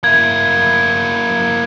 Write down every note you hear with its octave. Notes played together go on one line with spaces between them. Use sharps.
A#3 E4 G#6